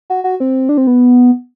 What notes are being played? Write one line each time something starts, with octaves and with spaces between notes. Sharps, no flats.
F#4
F#4
C4
D4
C4
B3